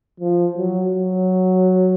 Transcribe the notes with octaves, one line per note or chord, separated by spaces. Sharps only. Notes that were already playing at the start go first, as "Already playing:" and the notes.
F3
F#3
F#3